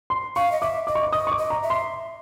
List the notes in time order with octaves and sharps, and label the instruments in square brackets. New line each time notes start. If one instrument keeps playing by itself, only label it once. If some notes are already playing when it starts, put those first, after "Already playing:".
[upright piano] C6
[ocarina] F5 [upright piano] C#6
[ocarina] D#5
[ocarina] E5 [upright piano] D6
[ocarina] D#5 [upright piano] D6
[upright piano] C#6
D6
[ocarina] D#5 [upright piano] D#6
[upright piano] C#6
D6
[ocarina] D#5
[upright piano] A#5
[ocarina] E5
[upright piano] C6